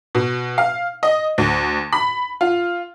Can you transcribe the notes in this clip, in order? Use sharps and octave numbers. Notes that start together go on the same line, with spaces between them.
B2
F5
D#5
D2
B5
F4